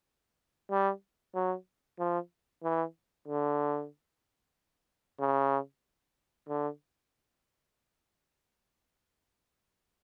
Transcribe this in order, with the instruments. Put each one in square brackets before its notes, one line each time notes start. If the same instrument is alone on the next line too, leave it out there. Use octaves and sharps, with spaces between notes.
[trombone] G3
F#3
F3
E3
D3
C#3
D3